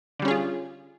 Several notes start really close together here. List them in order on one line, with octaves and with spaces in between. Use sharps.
D3 G3 C#4 G#4 F4